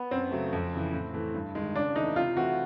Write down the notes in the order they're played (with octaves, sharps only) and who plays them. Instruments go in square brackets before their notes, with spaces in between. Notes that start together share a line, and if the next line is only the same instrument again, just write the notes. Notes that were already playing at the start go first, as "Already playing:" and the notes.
Already playing: [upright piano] B3
[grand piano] F#2 [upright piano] C4
[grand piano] C#3 F#3 A3
F2
C#3 E3
A2
E3 A3
G2
D#3 G#3
[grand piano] C#3 [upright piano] D4
[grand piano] E3 A3 [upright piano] D#4
[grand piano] C3 [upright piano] F4
[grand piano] E3 A3 C4 E4 [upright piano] F#4